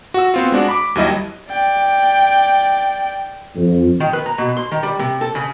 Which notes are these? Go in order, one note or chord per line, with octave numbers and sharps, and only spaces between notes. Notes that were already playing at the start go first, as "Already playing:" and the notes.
F#4 E6
B3 C4 F4
G#3 D4 F#4
B5 D6
D#2 F#3 G3 E4 D#5
D5 G5
F2
D#3
B4
A#5
B2
C6
D#3
G3
C3
A4
C#3